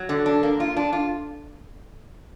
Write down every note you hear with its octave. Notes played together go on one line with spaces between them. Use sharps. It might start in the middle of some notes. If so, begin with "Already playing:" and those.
Already playing: F#3
D3
D4
A#3
F4
D4
F4